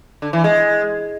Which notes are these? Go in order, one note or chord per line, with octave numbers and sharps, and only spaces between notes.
D3
E3
G#3